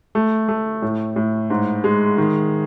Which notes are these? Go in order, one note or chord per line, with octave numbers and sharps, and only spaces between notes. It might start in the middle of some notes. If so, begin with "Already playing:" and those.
A3
A3
A2
A2
G#2
G#3
D#3